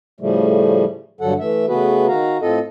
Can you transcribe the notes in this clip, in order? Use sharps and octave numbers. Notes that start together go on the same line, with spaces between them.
A2 C#3 F3 G3 A3
G2 D3 F#3 A4 F#5
E3 A3 E5
C#3 A3 B3 F#4 G#4 B4
D#3 F#4 F5 A#5
A2 C4 F4 A4 D#5